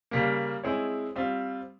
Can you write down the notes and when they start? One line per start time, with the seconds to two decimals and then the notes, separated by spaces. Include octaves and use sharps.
0.11 C#3 G3 A#3
0.63 G#3 C4 E4 G#4 C#5
1.16 G3 C4 F4